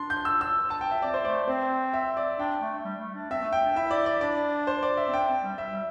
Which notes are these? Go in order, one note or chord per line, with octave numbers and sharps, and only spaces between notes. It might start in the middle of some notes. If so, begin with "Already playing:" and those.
Already playing: D4 C6
G6
E6
E6
A5
G5
E5
C4 D5
C5
A3 D5
C4 C5
E5
D5
D4 G5
A3
A3
G3
A3
D4
C4 E5
A3
G5
D4
E4 E5
D5
D5
D4 D5
C5
D5
E5
C4
D4 G5
C4
G3
E5
G3